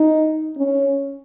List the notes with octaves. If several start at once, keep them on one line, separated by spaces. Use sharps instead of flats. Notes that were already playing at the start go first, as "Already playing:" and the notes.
Already playing: D#4
C#4